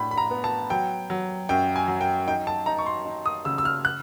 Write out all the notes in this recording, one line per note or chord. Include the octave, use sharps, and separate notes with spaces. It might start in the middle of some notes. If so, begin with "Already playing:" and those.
Already playing: A2 D4 B5
B5
A#5
B3
A5
F#3 G5
F#3
F#2 G5
G#5
F#3
G5
D#4 G5
A5
D#4 A#5
C#6
C6
D#4
D#6
C#3 E6
E6
F6
F#6